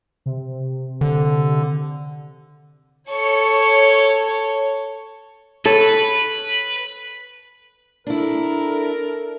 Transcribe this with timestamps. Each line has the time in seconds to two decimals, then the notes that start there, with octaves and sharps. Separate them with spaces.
0.26 C3
1.01 D3
3.09 A4 C#5 C#6
5.66 A4 B4 C#5
8.07 D4 E4 A4 A#4